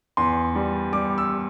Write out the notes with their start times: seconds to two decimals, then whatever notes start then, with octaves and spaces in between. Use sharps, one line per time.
0.17 E2 C6
0.55 G3
0.93 G3 D6
1.18 E6